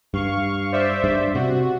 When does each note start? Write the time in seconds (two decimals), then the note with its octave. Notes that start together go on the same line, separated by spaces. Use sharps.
0.14 G2 F5 C#6
0.72 C5 D5 E5
1.04 G2
1.35 C3 F#4